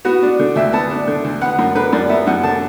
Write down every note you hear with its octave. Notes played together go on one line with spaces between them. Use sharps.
B3 F#4
D4
D3
D2 E5
B3 A5
D4
D3
D2
B3 F#5
F#2
D3 B4
F#2 D5
B3 E5
F#2 F#5
D3 A5